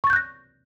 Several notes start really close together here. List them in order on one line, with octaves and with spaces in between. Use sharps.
C#6 A6 G6 F#6 A#6